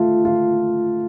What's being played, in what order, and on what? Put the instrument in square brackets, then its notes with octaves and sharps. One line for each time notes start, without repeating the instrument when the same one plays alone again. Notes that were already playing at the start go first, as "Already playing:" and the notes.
Already playing: [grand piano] A3 F4
F4